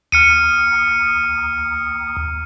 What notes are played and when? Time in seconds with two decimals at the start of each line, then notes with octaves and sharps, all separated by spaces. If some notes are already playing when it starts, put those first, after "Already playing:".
0.12 D#2 F6 C#7 D#7